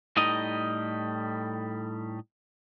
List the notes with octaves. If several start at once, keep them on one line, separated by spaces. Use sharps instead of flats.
A2 G3 D#4 D#5